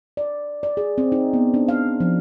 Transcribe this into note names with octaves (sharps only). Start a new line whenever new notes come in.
D5
D5
G#4
C4
D#4
B3
D4
F5
F3